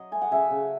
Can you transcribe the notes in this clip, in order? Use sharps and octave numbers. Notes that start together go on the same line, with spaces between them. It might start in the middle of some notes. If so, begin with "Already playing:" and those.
Already playing: F#3 D#5
A3 G#5
F#5
C#3 E5 G#5
C#3